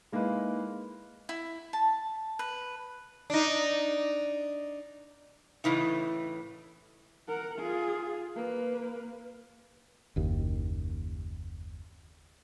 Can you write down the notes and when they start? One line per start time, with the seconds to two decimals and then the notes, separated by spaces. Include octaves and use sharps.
0.12 G#3 A#3 D#4 E4 B4
1.29 E4
1.73 A5
2.39 B4
3.30 D4 D#4
5.64 A2 C#3 E3 D#4
7.28 A#4 F#5
7.59 F4 G#4
8.35 A#3 B4
10.16 F#1 D#2